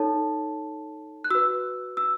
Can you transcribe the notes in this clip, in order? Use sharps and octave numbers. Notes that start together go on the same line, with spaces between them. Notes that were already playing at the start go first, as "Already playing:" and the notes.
Already playing: D#4 A4 C#5 A5
F#6
F#4 B4 E6
E6